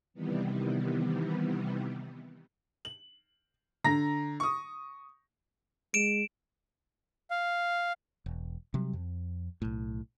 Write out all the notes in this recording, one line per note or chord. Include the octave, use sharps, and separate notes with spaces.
C3 D#3 E3 G3 B3
F#7
D3 A#5 A#6
C#6 D#6
G#3 D7 E7
F5
E1
C3 F#3 G3
F2
B1 A2